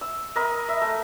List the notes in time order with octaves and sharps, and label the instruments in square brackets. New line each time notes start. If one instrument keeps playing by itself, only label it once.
[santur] E6
A#4 D#5 B5
E5
A3